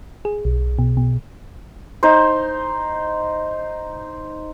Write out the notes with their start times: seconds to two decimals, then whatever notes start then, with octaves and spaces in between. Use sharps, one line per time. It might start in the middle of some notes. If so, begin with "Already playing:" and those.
0.25 G#4
0.45 B1
0.79 B2
0.97 B2
2.03 D#4 C5